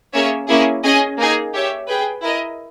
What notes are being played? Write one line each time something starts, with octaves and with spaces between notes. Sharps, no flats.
A#3 C#4 G#4 C#5 E5
A#3 C#4 E4 G#4
C#4 G#4 D#5 G#5
A#3 D#4 G#4
G4 C#5 E5
G#4 B4 G5
E4 A#4 D#5